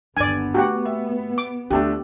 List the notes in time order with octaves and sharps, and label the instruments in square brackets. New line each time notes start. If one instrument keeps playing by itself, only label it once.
[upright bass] G1 D#2 [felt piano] D3 [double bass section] B3 [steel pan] D5 G#5
[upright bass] A3 [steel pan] F#4 G4 F#5
[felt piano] E5
[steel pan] D6
[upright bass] D2 F4 [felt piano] D3 A3 D4 [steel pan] G4